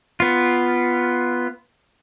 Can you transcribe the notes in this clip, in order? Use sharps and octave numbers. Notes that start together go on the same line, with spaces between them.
B3 F4